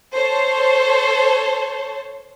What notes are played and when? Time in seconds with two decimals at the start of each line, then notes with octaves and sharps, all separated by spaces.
0.15 A4 C5 C#5 A5